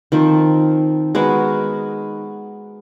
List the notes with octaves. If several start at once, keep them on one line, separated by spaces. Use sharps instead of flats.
D#3 F3 C4
G#3 B3 F#4 A#4